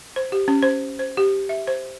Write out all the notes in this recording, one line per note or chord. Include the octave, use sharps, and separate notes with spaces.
C5
G4
C#4
C5
C5
G4
E5
C5